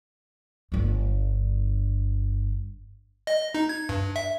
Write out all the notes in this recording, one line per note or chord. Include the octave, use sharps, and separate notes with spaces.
G1 G2
D#5
D#4
G#6
G2
E5